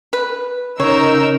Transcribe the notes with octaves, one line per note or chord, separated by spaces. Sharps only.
B4
C#3 D#4 A#4 C#5 E6